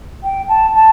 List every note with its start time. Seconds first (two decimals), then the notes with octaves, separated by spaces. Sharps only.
0.24 G5
0.49 A5
0.75 A5